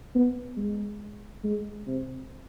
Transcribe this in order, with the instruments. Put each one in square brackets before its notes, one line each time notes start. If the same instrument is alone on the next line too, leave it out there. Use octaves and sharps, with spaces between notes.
[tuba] B3
G#3
G#3
C3